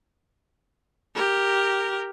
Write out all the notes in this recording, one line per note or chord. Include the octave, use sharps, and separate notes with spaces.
G4 A#4